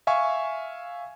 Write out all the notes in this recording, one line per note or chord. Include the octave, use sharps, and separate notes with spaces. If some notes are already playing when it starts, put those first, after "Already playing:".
E5 F5 G#5 C#6